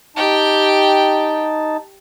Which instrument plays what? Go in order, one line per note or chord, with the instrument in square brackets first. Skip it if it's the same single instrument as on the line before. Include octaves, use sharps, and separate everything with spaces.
[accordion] D#4 A5 [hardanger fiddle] G4 G5